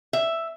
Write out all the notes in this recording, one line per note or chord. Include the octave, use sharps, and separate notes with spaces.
E5